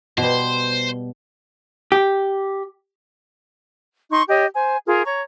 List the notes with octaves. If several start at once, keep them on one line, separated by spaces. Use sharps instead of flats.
B2 G3 C5
G4
D#4 C6 C#6
G4 C#5 D#5
C5 G#5
F4 G#4 A#4
C#5 A#5 C#6